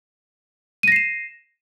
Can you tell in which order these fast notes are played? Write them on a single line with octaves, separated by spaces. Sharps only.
D#7 A#6 C7 E7